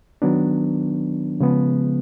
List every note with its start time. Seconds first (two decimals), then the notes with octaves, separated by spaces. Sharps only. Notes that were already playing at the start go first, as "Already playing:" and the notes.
0.22 D#3 F#3 B3 D4
1.40 C#3 F3 G#3 B3